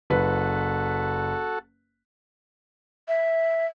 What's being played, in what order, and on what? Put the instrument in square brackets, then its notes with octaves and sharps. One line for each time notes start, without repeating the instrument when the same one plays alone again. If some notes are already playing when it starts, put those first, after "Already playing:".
[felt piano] F#1 B4 [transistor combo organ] F#4 A4
[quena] E5